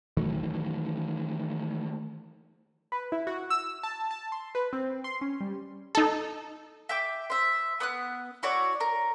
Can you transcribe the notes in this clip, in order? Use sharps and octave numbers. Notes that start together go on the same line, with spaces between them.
D#3 E3 F#3 A3
B4
E4
F#4
E6
A5
A5
C6
B4
C4
C6
C#4
G3
D#4 A4
E5 G5 D6
C5 E5
B3 D#6 F#6
E4 F#4 C#5 D5
A#4